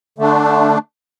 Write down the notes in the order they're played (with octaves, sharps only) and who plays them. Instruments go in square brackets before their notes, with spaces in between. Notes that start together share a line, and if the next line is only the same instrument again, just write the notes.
[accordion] D3 A3 D4